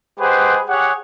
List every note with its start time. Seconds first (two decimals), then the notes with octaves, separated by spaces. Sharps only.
0.20 G#3 G4 G#4 B4 C5 F#5
0.68 G4 G#4 C#5 F#5